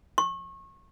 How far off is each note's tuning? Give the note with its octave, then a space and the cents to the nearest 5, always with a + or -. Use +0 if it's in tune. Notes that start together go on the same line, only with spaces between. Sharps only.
C#6 -30